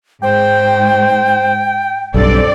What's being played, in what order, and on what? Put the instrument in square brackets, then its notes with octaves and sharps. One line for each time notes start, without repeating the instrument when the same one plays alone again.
[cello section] G#2 [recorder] C5 [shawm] G5
[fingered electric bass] B1 G2 [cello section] C4 D5 [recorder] A4